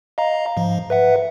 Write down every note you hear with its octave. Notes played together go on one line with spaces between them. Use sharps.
D#5 F5 A#5
G#2 F3
B4 E5 F#5